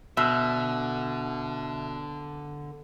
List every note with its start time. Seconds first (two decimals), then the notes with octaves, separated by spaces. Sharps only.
0.17 B2 D3 E5 E6